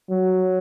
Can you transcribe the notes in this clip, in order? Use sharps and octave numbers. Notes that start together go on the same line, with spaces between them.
F#3